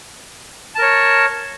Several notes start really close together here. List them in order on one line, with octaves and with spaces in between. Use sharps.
A5 A#4 C#5